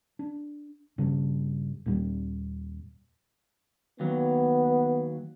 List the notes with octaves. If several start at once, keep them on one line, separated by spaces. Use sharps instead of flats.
D4
G2 C#3
D#2 A#2 G3
D#2 F#3 B3